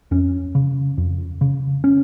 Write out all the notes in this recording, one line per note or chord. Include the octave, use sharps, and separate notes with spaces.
F2 C#4
C#3
F2
C#3
C#4